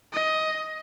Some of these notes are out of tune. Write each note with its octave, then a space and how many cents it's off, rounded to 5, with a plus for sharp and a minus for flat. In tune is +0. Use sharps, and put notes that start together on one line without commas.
D#5 +15